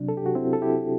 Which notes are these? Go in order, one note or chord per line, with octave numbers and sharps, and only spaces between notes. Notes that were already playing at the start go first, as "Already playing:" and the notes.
Already playing: C3 F#3 D4
A4
G4
F#4
C4 E4
A4
E4 G4